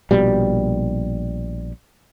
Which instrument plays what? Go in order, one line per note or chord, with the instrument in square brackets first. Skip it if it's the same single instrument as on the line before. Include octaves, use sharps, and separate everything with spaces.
[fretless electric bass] A#1 B2 G3